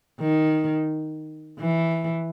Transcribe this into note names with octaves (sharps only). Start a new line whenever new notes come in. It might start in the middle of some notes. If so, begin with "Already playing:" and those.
D#3
E3